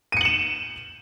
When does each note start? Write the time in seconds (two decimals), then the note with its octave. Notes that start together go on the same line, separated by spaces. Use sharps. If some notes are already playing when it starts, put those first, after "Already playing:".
0.12 D#7
0.17 C#7
0.21 F#7
0.25 E7